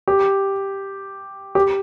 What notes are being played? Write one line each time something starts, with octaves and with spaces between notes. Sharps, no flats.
G4
G4